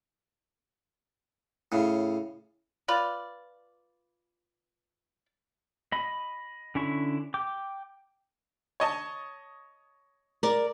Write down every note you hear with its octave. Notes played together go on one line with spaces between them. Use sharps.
A2 C#3
F4 B4 D5
D#5 B5
D3 C#4 E4 C#6
G5 D6
C#5 D#5 A5
A#4 D5